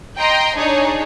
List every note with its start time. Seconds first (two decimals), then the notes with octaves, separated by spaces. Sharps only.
0.18 D#5 G5 A#5 C6
0.56 D4 D#4 G#4 C#5